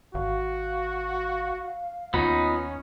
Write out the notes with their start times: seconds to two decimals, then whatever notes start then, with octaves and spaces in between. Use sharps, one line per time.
0.14 G#1 F#4 F5
2.14 D#2 B3 C#4 D#4 F4